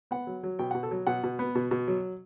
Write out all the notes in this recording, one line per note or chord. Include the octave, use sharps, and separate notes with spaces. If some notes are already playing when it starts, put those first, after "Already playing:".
B3 F#5
F#3
F#3
B2 G5
F#5
B2
A4
F#3
B2 F#5
B2
B3
B2
B2
F#3